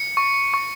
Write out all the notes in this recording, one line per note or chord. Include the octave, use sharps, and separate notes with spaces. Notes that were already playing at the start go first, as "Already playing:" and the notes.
Already playing: C#7
C#6
C#6